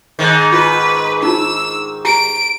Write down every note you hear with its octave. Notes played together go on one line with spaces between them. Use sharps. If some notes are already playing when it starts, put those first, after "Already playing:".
G#2 D#3
F4 B4
D4 D#4 F4 E6
G4 A#5 D7